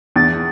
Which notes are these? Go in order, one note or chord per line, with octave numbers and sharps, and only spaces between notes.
E2 A6